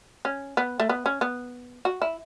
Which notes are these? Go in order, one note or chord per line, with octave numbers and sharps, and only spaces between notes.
C#4
B3
A3
B3
C#4
B3
F#4
E4